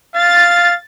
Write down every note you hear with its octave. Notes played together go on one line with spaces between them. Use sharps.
F5 A6